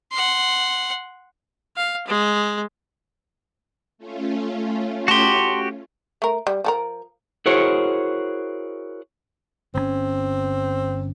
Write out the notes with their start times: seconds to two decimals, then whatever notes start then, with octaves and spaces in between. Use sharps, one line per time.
0.12 F#5 C6
1.76 F5
2.07 G#3
3.98 A3 C#4 F4
5.08 F#4 G4 A5 C6
6.22 A3 A#4
6.47 G3
6.64 F3 A4 A#4
7.46 E4 F#4 G#4 A#4 C5 C#5
9.74 G1 C#3 C4 C#4